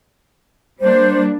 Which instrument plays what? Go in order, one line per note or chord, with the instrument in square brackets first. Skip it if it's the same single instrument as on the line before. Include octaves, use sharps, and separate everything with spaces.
[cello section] G3 A#3 D4 [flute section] C5